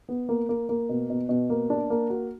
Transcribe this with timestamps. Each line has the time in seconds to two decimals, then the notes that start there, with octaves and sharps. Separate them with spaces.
0.09 B3
0.29 A#3
0.49 A#3
0.69 A#3
0.89 B2
1.10 B2
1.29 B2
1.50 A#3
1.70 D4
1.90 A#3
2.10 F#4